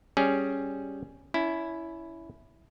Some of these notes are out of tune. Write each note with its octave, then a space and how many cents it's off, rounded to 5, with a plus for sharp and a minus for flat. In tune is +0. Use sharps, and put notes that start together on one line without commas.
G3 +0 C#4 +0 G#4 +0
C#4 +30 E4 +0